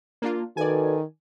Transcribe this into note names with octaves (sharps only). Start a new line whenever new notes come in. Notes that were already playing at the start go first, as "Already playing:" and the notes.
A#3 D4 F4
D#3 F#4 A4 B4 D5 G#5